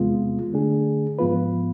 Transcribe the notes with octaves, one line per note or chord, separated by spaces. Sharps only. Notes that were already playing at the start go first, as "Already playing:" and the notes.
Already playing: E2 C3 G#3 B3 F4
D3 A3 D4 G#4
G#2 F3 B3 F4 B4